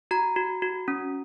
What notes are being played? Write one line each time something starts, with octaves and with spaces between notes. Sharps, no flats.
F#4 A#5
F#4
F#4
C#4